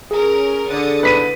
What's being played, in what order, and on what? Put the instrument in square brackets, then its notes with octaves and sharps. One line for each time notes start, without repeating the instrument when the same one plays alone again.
[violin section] C#4 A#4 [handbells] G#4
[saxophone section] D3 [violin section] D#6 A6 C#7
[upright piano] B4 B6 D#7